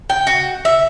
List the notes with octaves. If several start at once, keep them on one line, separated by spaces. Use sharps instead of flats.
G5
F#4
E5